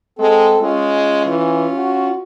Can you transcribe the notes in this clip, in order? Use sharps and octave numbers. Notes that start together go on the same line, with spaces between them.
G#3 C4 A4
G#3 C#4 F4
E3
F#4